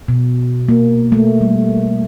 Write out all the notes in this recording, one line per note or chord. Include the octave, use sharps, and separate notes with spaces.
B2
A#3
A3
G3